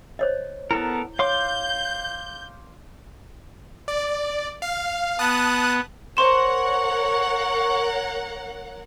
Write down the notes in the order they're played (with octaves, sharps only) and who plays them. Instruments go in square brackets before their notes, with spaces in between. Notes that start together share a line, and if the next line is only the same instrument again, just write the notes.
[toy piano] C5 C#5 D#5
[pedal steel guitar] B3 A4 A#4 [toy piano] E4
[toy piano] C#5 [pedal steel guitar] F5 C6 D6 [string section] G6
[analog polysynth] D5
F5
[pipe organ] B3 [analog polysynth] A5 D#6 F#6
[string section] A#4 C#5 F#5 [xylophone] C5 C6 E7 [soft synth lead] C#6